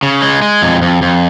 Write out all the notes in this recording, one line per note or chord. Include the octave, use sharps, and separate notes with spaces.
C#3
G#3
G#3
F2
F2
F2